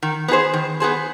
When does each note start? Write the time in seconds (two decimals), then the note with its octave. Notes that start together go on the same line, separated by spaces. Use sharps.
0.03 D#3
0.28 B3 D#4 G#4 C5
0.54 D#3
0.80 B3 D#4 G#4 C5